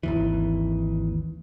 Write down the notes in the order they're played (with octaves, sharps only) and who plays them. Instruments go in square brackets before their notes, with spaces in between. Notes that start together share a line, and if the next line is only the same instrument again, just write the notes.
[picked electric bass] G#1 D#2 E3